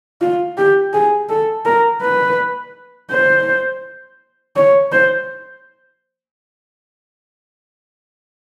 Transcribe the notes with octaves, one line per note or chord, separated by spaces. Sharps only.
F4
G4
G#4
A4
A#4
B4
C5
C#5
C5